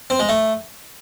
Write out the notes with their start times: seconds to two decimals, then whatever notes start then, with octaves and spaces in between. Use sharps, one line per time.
0.10 C4
0.19 G#3
0.29 A3